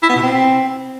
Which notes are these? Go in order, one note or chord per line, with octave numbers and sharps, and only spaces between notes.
E4
B3
B2
C4